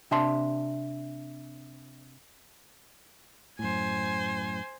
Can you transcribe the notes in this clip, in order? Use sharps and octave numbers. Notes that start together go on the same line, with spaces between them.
C3 D4 E5 A5 C6
F#2 A2 C5 G#5